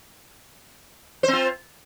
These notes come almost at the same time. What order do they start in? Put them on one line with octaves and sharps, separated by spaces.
C5 C4 F4